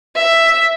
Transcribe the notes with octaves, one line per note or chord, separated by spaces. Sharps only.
E5